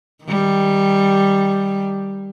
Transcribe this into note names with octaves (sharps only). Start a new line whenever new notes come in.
D#3 G3